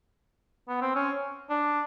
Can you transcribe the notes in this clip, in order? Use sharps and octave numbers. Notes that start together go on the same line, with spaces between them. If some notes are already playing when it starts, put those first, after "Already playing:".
B3
C4
C#4
D4